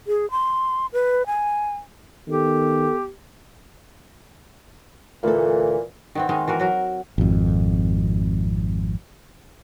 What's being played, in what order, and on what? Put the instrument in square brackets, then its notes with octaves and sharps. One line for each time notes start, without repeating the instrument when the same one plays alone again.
[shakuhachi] G#4
C6
B4
G#5
[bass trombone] D#3 [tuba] B3 [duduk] G4 [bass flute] A4
[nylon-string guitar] D2 A4 [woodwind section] A#2 E3
[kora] D#3 B3 C4
D#3 G#3 D#5 F5
E3 F#4 A#4
F#3 F#4 A#4
[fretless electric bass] G#1 F2